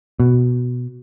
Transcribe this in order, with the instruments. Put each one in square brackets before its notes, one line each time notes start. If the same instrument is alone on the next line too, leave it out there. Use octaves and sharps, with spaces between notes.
[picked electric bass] B2